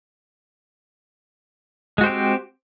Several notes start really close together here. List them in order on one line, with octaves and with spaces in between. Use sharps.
G#3 F#4 C5 G4 C4